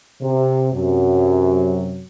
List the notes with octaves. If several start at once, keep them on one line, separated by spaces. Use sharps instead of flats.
C3
F#2 C3 F#3